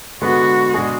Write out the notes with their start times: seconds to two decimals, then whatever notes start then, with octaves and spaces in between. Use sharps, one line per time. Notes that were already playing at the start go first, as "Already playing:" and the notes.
0.22 D3 G#3 B3 F#4
0.74 B2 G#3 D4 G#4